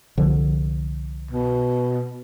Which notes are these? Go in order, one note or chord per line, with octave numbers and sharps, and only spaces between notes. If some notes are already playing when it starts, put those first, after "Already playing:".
C2 D3 F3
B2